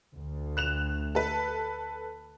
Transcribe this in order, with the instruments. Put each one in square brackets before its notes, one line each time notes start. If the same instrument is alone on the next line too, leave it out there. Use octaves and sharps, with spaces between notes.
[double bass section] D2
[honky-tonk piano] F#6 E7 F7
A4 B4